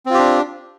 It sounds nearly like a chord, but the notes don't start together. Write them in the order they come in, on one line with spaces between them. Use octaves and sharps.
C4 F4 G4 D4